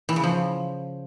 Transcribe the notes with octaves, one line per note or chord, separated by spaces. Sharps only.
E3
C#3
F3